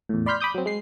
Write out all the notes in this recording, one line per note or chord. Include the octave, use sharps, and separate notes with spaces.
E2 A2
D5 B5 C6 F6 G6 B6
B5 D6 D#6 G6
F#3 C4
G#3 C7